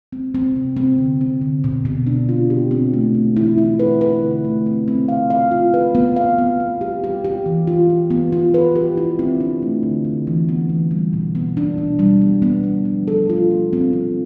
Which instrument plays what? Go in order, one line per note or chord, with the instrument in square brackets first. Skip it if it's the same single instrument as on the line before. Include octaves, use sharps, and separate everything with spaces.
[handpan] C4
C4
C3
C4
D3
C4
D3
B2
B2
D4
F4
G4
C4
A3
A3
E4
E4
B4
B4
D3
A3
C4
C4
F5
F5
F4
B4
B3
F5
B3
B3
G4
G4
G4
E3
F4
F4
B3
F4
B4
G4
E4
C4
D4
A3
D3
D3
E3
B3
E3
G3
B2
B3
D4
B2
G3
B3
B3
D4
F3
A4
F4
B3
C4
C4